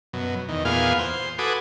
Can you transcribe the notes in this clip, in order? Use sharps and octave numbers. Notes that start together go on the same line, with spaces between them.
F#2 B2
E2 D#3
E2 A#2 B3 F4 G#4 F5
C5
F#4 A4 B4 G#5 D6 D#6